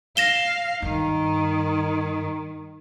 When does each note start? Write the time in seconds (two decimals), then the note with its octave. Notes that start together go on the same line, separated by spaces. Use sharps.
0.17 F5 A#6 E7 G7
0.82 G2 D#3